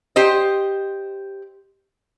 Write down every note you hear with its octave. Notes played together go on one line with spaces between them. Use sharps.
G4 C5 D#5